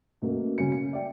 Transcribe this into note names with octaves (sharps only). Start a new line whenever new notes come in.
F#2 B2 F#3 A3 A#3
C#3 F#3 C#4 C#7
C#7
D5 E5 G5